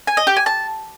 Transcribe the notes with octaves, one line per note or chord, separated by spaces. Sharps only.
G#5
D#5
G4
G#5
A5